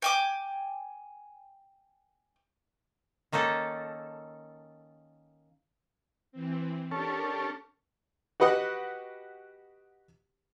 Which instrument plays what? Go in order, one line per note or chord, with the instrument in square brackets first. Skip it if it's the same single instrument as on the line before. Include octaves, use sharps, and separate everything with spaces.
[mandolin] G5 G#5 D6
[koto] D#3 A#3 C#4 D#4 A4
[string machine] E3 C4
[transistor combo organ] C#4 A4 [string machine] D4 G4 A#4
[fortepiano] F#4 G4 B4 D#5 F#5